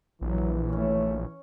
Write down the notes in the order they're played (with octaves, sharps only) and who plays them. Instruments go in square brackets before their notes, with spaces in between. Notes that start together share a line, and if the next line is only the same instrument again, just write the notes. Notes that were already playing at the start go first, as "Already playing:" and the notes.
[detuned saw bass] A#1 [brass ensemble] E3 [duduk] F#3
[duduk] A3 [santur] C#4 C#5